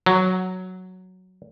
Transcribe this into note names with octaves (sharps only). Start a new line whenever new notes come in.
F#3